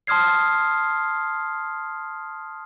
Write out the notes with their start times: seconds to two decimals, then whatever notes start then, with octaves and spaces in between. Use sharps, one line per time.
0.07 A5 C6 D#6 F6 G#6 C7